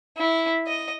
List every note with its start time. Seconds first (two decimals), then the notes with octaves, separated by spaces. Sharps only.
0.17 E4
0.67 D#5